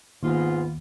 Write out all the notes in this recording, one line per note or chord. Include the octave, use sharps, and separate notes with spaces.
D#2 G#2 B3 F4